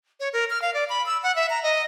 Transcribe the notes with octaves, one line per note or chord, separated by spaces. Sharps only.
C#5
A#4
F6
F5
D5
B5
E6
F#5
E5
A#5
D#5